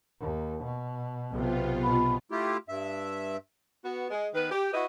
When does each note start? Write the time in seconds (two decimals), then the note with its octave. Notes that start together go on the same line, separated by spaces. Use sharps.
0.20 D#2
0.64 B2
1.33 B1 C3 B3 F4
1.83 B2 B5
2.31 A3 E4 F4 G4
2.69 G2 E5
3.84 B3 F#4
4.10 G#3
4.34 D#3 B3 B4
4.50 G4
4.72 E4 F#4 B4 D#5